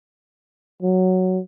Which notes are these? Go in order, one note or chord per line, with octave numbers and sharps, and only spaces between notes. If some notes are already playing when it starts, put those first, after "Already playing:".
F#3